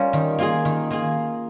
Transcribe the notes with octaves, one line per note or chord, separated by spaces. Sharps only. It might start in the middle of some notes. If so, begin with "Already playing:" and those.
Already playing: G3 C#4 F4 A#4
D#3
A#3 F4 G#4
D#3
A#3 F4 G#4